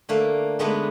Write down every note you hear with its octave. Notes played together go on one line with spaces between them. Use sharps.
D3 A3 A#3
D3 G#3 A3 B3 D4 D#4